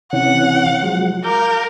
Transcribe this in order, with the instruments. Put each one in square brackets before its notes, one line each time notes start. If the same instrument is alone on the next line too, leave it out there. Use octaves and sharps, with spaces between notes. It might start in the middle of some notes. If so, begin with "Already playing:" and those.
[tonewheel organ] C3 E3 C#4 [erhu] F#5
[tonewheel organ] F3 F#3 G#3
[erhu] A#4 [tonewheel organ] F5 D6 G6